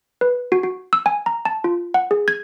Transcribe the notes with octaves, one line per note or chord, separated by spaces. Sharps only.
B4
F#4
F#4
E6
G#5
A#5
A5
F4
F#5
G#4
G#6